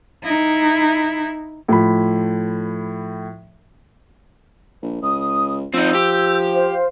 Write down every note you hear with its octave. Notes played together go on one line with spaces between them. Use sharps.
D#4 E4
A2 F3 B5
A#1
C#2 D#6
F3 C4 D#4 E6 G6
G4
C5 F5